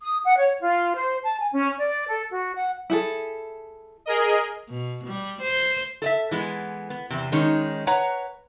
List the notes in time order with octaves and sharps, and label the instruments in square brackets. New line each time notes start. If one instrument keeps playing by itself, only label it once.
[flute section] D#6
F#5
C#5
F4
C5
A5
G#5
C#4
D5
A4
F#4
F#5
[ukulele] E4 G#4 A4
[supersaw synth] G#4 A#4 D#5
[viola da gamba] B2
G3
C5
[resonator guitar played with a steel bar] A4 D#5 E5
E3 G#3 B3
B3
E2 C3
D#3 G#3 C#4 D#4
B4 C#5 F#5 A#5